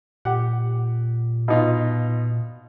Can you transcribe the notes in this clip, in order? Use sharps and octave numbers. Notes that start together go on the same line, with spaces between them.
A#2 G4 F#5
B2 D#4 F4